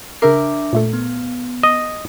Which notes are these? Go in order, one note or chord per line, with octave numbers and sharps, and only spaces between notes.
C#3 D4 A#4 E5 D6 E6 C7
A#2 A3 A4
B3
D#5